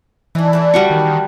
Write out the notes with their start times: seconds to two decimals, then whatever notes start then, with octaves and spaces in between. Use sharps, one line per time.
0.35 E3 D4 D#4
0.53 A3 D4 E4
0.74 G3 F#4 C#6
0.90 D#3